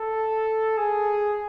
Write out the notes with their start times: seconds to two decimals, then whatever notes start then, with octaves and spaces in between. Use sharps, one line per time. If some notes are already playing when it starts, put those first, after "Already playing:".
Already playing: A4
0.78 G#4